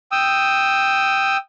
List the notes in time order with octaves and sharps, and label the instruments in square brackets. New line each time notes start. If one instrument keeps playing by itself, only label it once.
[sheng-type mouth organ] G5 D#6 E6